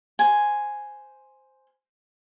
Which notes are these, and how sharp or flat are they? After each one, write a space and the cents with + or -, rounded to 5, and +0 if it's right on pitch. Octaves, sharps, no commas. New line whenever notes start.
C5 +0 G#5 +0